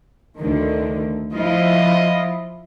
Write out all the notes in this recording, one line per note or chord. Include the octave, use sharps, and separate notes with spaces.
D2 D3 D#3
F3 E4 F4 D#5